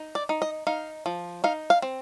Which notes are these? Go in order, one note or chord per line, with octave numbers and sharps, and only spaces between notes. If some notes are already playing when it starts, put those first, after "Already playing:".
Already playing: D#4
D5
D#4
D#5
D#4 F5
F3
D#4 F5
F5
C4